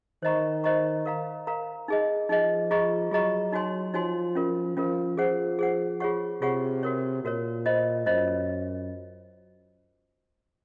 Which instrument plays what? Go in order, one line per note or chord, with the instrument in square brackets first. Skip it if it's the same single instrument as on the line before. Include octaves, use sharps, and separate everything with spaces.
[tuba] D#3 [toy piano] C5 D#5 A#5 C#6
[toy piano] C5 D#5 A#5 C#6
A#4 F5 A#5
A#4 F5 A#5
D#4 G#4 D#5
[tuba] F3 [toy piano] D#4 G#4 D#5
[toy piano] F4 G#4 D#5 A#5 C#6
[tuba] F#3 [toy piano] F4 G#4 D#5 A#5 C#6
[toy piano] D#4 F#4 C#5 G#5 C6
[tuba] F3 [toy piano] D#4 F#4 C#5 G#5 C6
[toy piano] C#4 F4 A#4
[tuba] F3 [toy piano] C#4 F4 A#4
[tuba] F3 [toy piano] G#4 C5 F#5
[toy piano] G#4 C5 F#5
F4 G#4 C#5 F#5 C#6
[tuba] C3 [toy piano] F4 G#4 C#5 F#5 C#6
[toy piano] F#4 A#4 C#5
[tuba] A#2 [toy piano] F#4 A#4 C#5
[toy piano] F4 C5 D#5
[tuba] F#2 [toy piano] F4 C5 D#5